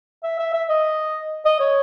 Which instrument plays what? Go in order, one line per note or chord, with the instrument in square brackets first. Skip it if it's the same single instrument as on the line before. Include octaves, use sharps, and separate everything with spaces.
[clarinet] E5
E5
E5
D#5
D#5
C#5